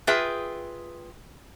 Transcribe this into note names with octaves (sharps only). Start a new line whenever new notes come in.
F4 G#4 B4 E5 G5